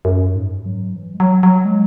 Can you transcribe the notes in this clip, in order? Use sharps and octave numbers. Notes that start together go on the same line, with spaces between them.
F#2
G#2
F#3
E3
G#3
F#3
F#3
G#3